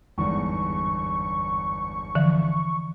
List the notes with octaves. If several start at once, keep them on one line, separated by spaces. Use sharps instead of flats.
G1 E2 G#2 C#6
D3 E3 F3